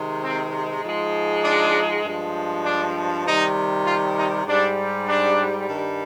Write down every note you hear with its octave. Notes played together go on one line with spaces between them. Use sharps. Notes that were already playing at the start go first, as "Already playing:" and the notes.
Already playing: C3 D#3 G#3
C4
G#2 F3 G#3
D4
G2 F3 G#3
D4
C3 D#3 G3 D#4
F4
D#4
G#2 G3 D4
D4
G2 D#3 G3